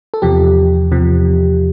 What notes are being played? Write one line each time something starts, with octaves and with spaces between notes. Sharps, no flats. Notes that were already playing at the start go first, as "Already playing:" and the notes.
A4
E2 C3 F3 G4
E2 C3 F3